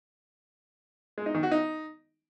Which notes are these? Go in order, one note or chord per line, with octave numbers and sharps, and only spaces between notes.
G#3
D#4
D#3
F#4
D#4